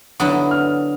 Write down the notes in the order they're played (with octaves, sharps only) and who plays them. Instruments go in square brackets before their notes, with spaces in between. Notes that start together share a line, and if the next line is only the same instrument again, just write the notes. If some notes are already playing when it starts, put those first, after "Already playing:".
[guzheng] D3 F#3 B3 E4 [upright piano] D#6
[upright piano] F6